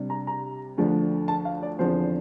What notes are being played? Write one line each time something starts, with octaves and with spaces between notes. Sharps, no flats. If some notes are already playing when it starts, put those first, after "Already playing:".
Already playing: C3 G3 D4
A#5
A#5
D2 D3 F3
A5
F5
D5
E2 D3 F3 C4 C5